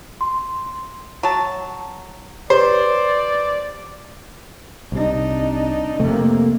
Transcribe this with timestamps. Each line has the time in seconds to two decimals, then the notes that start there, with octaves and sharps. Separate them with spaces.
0.21 C6
1.23 F#3 A5
2.50 G4 B4 C5 D5
4.92 C2 C3 D4 D#4
6.00 F2 C3 A3 A#3